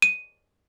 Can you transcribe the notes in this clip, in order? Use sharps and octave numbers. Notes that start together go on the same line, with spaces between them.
D#7